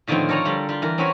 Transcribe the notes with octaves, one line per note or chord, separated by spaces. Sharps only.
A2 D3 D#3 F3 B3 C4
A4 A#4 C#5 D5 G#5 A#5
D3 G3 F4
G3 F4
E3 A#4
C4 C#4 E4 F#4 B4 C#5